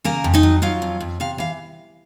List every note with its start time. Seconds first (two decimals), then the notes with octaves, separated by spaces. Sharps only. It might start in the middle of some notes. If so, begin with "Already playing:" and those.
0.04 C#3 A#3 A#4
0.24 F2
0.34 D#4 D#5
0.43 F#3
0.62 F#3 F4 F5
0.82 F2
1.01 F2
1.20 C3 F5
1.38 E3 F5